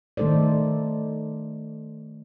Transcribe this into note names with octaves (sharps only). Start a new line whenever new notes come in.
D#3 A3 D#4 A4 C5 D5